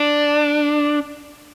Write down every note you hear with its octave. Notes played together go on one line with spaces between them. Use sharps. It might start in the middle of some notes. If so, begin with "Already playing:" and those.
Already playing: D4